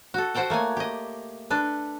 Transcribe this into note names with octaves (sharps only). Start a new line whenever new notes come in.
F#4 A4
F#4 C5 F#5 G5 A5
A3 A#3 C#5 G#5
G4 D#5
D4 A4 B4